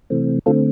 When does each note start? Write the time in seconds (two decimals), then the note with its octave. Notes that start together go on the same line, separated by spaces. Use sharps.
0.10 C3 E3 A3 C4
0.46 D3 A3 C4 F4 A4